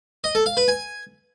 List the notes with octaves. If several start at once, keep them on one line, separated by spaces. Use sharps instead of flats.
D#5
A4
F5
B4
G#5